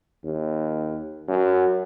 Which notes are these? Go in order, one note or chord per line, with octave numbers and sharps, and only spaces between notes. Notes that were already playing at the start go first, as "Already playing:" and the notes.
D#2
F#2